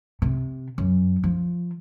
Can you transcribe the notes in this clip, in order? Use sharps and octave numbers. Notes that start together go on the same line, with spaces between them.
C3
F#2
F3